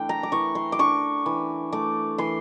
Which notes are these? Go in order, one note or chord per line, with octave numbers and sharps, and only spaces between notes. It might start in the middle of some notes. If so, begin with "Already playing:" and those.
Already playing: E3 A3 D4 G5
A#5
D6
E3 C#6
C6
D6
D4 C#6
E3
A3 D6
E3 C6